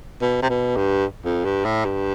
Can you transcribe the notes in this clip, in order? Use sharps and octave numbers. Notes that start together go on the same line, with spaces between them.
B2
C3
B2
G2
F2
G2
A2
G2